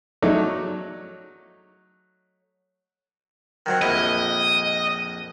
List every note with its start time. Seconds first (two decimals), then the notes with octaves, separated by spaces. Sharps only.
0.22 F#3 A3 D#4 C#5 D5
3.66 D#3 F#3 C4
3.82 A#1 F2 E4 D#5